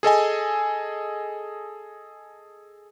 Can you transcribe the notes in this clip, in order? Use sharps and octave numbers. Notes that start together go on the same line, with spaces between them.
G#4 A4 D#5 G#5